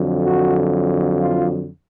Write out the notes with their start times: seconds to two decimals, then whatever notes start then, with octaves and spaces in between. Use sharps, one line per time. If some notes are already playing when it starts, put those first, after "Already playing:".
Already playing: F2 D3 F#3
0.24 F#4
1.20 F4